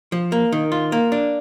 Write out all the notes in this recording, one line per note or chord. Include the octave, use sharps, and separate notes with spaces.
F3
A#3
D#3
F4
A#3
D4